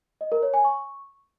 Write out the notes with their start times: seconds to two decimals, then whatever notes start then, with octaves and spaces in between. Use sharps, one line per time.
0.21 D#5
0.32 A#4
0.43 C#5
0.54 G#5
0.64 C#6